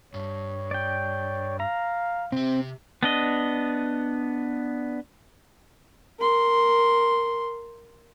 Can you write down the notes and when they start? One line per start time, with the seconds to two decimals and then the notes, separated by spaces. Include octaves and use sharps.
0.14 G2 C#5
0.71 D5 G5
1.60 F5 A#5
2.32 C3 C4 G4
3.03 B3 D4 D#5
6.20 A#4 C6